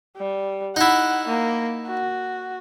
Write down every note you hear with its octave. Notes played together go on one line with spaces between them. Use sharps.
G3
D#4 E4 F#5
A#3
F#4